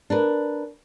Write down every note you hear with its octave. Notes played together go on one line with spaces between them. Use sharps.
D4 A#4 B4